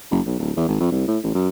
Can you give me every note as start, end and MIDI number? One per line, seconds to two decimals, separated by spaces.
0.11 0.20 30
0.26 0.36 35
0.39 0.51 26
0.56 0.65 40
0.68 0.79 32
0.80 0.90 41
0.92 1.04 36
1.08 1.18 45
1.23 1.34 33
1.35 1.49 42